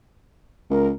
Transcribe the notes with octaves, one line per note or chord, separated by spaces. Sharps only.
C#2 A#4